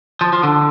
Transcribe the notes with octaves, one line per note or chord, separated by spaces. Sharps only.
F3
F3
D3